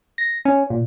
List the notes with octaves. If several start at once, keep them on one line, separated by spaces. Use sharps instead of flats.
A#6
C#4
A#2